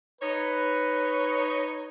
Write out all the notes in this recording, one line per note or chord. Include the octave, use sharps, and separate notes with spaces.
D#4 B4 C#5